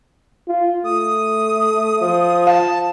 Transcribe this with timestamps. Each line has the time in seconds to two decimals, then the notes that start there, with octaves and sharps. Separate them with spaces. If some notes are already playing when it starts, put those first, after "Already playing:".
0.48 F4
0.85 A3 D#6
2.01 F3
2.47 F5 A5